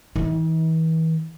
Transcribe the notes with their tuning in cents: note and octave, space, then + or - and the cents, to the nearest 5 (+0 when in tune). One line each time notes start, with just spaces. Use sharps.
E3 -35 D#4 +45